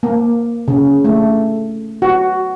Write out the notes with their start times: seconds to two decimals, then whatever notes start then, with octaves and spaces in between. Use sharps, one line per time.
0.03 A#3
0.68 C#3
1.04 A3
2.02 F#4